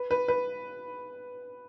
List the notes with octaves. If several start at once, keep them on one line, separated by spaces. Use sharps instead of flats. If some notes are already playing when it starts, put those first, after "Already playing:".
Already playing: B4
B4
B4